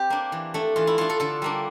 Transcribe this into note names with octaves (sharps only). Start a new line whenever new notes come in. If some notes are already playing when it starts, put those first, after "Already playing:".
Already playing: C4 G4
A#3 D4
E3
A3 D4
E3 F4
E4
A3 D4 F4
A4
D3 A4
G3 A#3 D4